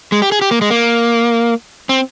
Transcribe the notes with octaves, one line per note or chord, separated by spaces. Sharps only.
G#3
G4
G#4
G4
A#3
G#3
A#3
C4